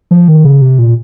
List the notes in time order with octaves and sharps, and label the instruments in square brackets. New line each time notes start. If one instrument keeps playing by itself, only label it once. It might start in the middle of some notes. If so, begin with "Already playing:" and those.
[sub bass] F3
D#3
C#3
C3
A#2